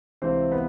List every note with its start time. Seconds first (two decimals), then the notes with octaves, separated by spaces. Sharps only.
0.22 C#2 C3 E3 C4 C5
0.52 B3 B4